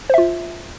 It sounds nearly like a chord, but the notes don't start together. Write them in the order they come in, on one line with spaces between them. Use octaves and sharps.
C5 E5 F4